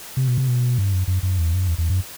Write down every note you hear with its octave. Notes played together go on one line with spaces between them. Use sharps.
C3
B2
C3
B2
G2
F#2
F#2
F#2
E2
F#2
E2
E2
F#2